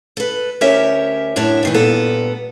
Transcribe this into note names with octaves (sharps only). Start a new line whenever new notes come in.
A4 B4
D2 C#4 G4 A#4 C#5 E5
F#2 A2 D4 C#5 E5 A5
G2 D#3 E3
G2 A#2 B3 A4